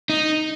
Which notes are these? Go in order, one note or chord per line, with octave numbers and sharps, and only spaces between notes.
D#4